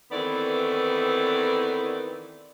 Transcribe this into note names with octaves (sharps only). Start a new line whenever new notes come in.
D#3 E3 A3 B3 C4 D5